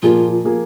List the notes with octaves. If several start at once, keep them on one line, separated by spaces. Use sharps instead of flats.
A#2 F3 A#3 F4 G#4
F3 A#3 G#4